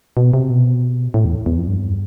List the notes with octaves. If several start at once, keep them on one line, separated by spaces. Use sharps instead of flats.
B2
C3
B2
A2
E2
E2
F2
G2